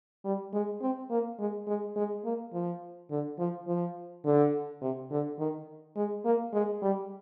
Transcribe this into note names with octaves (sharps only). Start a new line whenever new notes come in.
G3
G#3
C4
A#3
G#3
G#3
G#3
A#3
F3
D3
F3
F3
D3
C3
D3
D#3
G#3
A#3
G#3
G3